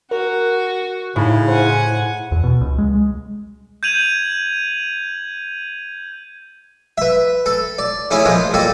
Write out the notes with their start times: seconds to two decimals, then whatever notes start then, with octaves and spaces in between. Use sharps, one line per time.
0.11 F#4 A#4
1.16 A2 C#3 D#4 E4 G#4
1.48 E4 C5 F#5 G#5
2.32 E2
2.44 B2
2.61 C#2
2.78 G#3
3.83 G6 G#6 D#7 F7 F#7
6.98 B4 E5
7.46 A4
7.78 D5
8.11 A3 C#4 E4 G#4
8.25 A#2 F3 G#3
8.54 A#2 G3 A4